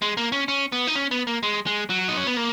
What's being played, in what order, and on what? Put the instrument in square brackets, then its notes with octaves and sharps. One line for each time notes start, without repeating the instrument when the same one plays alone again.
[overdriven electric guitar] G#3
A#3
C#4
C#4
B3
D#4
C#4
B3
A#3
G#3
G#3
F#3
D#4
C#4
B3
A#3